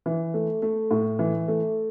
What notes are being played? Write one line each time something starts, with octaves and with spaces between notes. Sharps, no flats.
E3
A3
A3
A2
E3
A3